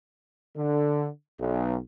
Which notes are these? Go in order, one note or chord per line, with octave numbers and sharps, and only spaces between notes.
D3
B1